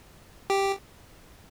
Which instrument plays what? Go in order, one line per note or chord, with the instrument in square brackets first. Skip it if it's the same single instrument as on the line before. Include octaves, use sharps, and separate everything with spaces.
[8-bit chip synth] G4